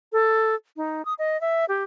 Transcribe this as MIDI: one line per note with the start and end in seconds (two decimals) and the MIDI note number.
0.12 0.55 69
0.77 1.05 63
1.05 1.14 87
1.19 1.39 75
1.41 1.65 76
1.69 1.84 67